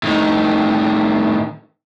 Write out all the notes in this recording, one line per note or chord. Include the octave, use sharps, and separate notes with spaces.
A2 D#3